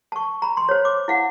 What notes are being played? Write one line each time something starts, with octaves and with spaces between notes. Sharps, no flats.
A5 C#6
A#5 B5
C6
C5 C#5
D6
E4 F5 F#5